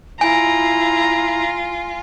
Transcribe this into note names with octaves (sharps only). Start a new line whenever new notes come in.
E4 F4 G#5 A#5